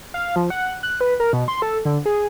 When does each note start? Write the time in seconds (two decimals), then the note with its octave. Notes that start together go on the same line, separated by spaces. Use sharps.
0.14 F5
0.36 F3
0.50 F#5
0.83 F#6
1.01 B4
1.20 A#4
1.33 B2
1.48 C6
1.62 A4
1.85 D3
2.06 G#4